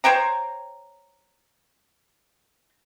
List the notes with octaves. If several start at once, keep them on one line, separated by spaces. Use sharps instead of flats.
C5 C#5 G5 A#5